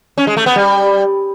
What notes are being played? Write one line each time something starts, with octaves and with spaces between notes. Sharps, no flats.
C#4
G#3
A3
B3
G3